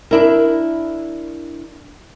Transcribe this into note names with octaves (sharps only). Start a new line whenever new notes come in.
D4 E4 A#4